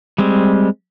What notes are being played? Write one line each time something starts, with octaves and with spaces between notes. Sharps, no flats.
G3 G#3 C4